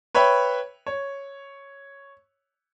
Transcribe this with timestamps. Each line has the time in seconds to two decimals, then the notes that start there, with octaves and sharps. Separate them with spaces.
0.15 B4 C#5 E5 G5 B5
0.87 C#5